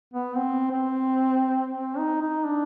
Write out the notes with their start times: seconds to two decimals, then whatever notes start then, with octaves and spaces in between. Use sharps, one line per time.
0.14 B3
0.36 C4
0.71 C4
1.74 C4
1.98 D#4
2.21 D#4
2.44 D4